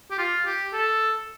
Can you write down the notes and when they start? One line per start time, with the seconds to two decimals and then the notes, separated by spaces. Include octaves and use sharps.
0.11 G4
0.19 F4
0.46 G4
0.73 A4